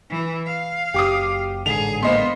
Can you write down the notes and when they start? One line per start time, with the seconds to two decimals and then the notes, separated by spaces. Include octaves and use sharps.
0.10 E3
0.47 F5
0.94 F#1 G4 D6 D#6
1.66 A1 G#2 D3 G#4 F7
2.03 A#3 B3 C5 D#5 C6